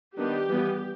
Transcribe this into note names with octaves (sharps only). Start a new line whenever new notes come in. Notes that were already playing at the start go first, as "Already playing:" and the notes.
D#3 G3 B3 D4 G4
E3 G3 B3